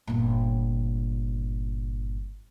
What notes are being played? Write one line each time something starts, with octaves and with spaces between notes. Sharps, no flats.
G1 A#2